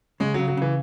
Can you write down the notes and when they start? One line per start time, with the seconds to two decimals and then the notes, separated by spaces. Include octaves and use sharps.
0.20 C#3 G#3
0.34 C#3 F#3
0.48 F#3
0.57 C#3 E3